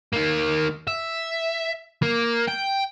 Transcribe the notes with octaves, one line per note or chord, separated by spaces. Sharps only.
D#3 A#3
E5
A#3
G5